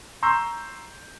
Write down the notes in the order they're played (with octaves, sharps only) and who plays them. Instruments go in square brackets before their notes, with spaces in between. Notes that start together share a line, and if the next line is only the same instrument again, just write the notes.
[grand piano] A#5 C6 C#6 E6 G6